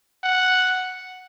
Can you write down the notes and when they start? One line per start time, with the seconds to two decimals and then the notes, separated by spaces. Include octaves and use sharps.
0.24 F#5